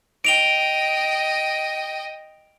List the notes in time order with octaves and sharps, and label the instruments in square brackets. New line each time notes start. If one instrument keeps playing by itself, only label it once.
[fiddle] D#5 G5 [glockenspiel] D7 F7 G7